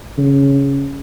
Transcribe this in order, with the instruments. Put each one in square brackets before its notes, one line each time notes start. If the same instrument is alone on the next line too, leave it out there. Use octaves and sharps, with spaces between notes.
[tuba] C#3